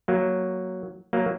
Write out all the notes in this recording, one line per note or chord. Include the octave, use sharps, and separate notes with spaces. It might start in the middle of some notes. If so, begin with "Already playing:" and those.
F#3 A#3
F#3 A#3